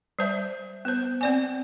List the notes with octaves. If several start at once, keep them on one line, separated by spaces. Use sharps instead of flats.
G3 C5 E5
B3 C5
C4 D5 G#5